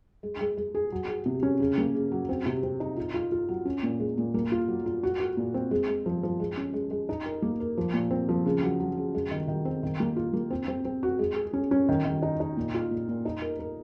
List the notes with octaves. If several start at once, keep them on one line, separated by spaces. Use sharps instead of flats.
G#3
G#3
G#3
G#4
F#3
G#4
C3
C#4
C#3
A#3
C#3
F#3
C4
C3
C4
D#4
F4
F4
F4
F#3
C#4
A#2
G#3
A#2
A#3
F4
F#3
F4
F#4
F#4
A#2
C4
G#3
G#3
F3
F3
G#3
C#4
G#3
G#3
D#4
A#4
A#3
A#4
F3
A#2
C4
F3
C#3
F#3
F#3
C#3
G#3
D#3
D#3
C4
D#3
A#3
F4
A#3
C4
C4
C4
F#4
G#3
G#4
C#4
C#4
D#3
D#3
D#4
D#4
A#2
F4
A#2
A#2
D#4
A#4
A#4